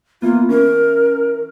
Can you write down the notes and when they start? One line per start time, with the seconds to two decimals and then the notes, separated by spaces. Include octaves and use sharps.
0.22 E3 A#3 B3 F4
0.49 E3 C#4 A#4